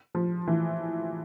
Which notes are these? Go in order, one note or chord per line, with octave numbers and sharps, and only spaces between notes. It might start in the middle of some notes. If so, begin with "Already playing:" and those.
F3
E3